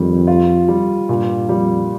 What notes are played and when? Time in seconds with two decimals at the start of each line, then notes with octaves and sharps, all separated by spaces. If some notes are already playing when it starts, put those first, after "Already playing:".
Already playing: F2 D#3 G3
0.27 F4
0.68 G3
1.09 G2 A#2
1.49 F2 G3